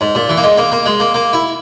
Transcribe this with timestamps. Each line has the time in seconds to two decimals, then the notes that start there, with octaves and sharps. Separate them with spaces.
0.01 G#2
0.15 A#2
0.29 E3
0.37 A#3
0.43 G#3
0.58 A#3
0.72 A#3
0.86 G#3
1.00 A#3
1.14 A#3
1.33 E4